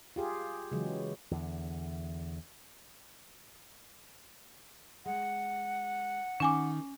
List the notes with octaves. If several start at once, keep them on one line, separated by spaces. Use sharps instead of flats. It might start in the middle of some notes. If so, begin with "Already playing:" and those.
F4 G4 G#4
C#3 E3 F#3 G#3
E2 D3
G#3 F#5
D#3 C#4 G#5 D6